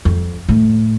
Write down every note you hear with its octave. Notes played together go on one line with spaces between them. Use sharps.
F2
A2